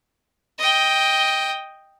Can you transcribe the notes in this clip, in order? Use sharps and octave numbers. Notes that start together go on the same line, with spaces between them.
D#5 G5